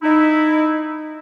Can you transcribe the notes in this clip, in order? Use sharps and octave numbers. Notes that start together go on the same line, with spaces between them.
D#4 E4